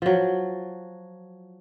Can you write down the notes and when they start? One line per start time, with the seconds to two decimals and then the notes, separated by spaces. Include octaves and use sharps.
0.02 F3 F#3